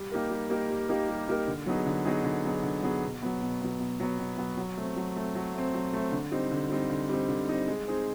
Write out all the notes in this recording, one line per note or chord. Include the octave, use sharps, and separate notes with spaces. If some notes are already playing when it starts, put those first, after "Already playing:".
Already playing: G3
A#3 D#4 G4 A#4
G3
A#3 D#4 G4 A#4
G3
A#3 D#4 G4 A#4
G3
A#3 D#4 G4 A#4
D3
F#3 B3 D#4 G#4
D3
F#3 B3 D#4 G#4
D3
F#3 B3 D#4 G#4
D3
F#3 B3 D#4 G#4
B2
F#3 B3
B2
F#3 B3
B2
F#3 B3
B2
F#3 B3
F#3
A3 C4
F#3
A3 C4
F#3
A3 C4
F#3
A3 C4
D3
G3 C4 D#4
D3
G3 C4 D#4
D3
G3 C4 D#4
D3
G3 C4 D#4
G#3
C4 D#4 G#4 C5